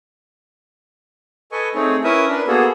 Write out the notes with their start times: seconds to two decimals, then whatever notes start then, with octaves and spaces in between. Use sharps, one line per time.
1.52 A4 B4 D#5 G#5 C#6
1.75 A3 C4 D#4 G#4 C#5
2.04 C#4 E4 A#4 B4 E5 D#6
2.28 D4 A#4 B4
2.48 A#3 B3 F#4 G#4 A4